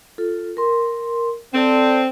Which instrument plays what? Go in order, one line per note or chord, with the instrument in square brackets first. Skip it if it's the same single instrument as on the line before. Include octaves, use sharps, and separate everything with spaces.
[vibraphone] F4 A4
A#4 C6
[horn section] C4 [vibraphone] A4 D5 A5